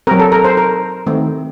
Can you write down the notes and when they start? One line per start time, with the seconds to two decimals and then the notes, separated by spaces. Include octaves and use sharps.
0.07 F#3 C4 A#4
0.19 A4
0.32 A#4
0.44 C5
0.57 A#4
1.06 D#3 A3 C4